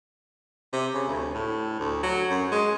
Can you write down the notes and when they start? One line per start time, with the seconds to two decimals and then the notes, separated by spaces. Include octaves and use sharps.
0.73 C3
0.94 C#3
1.08 D2
1.35 A2
1.79 D2
2.03 F#3
2.30 F#2
2.52 G#3